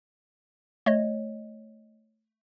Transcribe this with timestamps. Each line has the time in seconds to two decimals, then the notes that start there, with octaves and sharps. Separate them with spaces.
0.86 A3 C#5 D#5